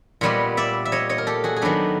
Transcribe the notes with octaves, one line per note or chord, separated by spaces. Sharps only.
A#2 G3 B3 C#5 D#5
D5 E5
E5
C#5 D#5
C#5 D#5
A#4
G4 A4
F#4 G#4
G#4
D#3 F#3 B3 D4 G4 A4